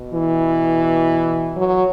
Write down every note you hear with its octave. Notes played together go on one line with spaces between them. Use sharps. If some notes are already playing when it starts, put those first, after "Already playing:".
Already playing: B2
E3
F#3